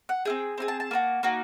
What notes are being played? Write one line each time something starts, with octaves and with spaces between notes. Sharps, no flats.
F#5
C4 E4 G#4 G5
C4 E4 G#4
A5
A5
A#3 D#4 F#4
A#3 D#4 F#4